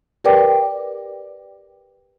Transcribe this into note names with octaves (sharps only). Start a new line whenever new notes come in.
G4 A#4 B4 D5 G5 D6